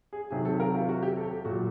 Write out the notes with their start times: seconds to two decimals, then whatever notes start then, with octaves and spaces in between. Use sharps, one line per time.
0.13 G#4
0.31 C3 D#3 F#3 G#4
0.45 A4
0.60 A#4
0.75 F4
0.89 F#4
1.03 G4
1.17 A4
1.31 G4
1.45 A#2 F#3 F#4